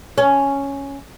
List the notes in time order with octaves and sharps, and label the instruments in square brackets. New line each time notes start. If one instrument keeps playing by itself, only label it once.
[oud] C#4